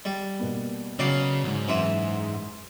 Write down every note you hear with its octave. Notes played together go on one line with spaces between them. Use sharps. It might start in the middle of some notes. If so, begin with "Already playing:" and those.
G3
B2 A#3 B3
C#3 F#3 D5 F5
B1 G#2
F#2 E3 E5 C6 D#7